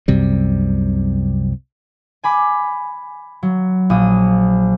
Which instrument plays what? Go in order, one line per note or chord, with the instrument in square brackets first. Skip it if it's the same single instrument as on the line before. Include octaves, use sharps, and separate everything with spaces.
[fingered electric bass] C2 F#2 C3 G3
[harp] G#5 B5 D6
F#3
A#1 D#6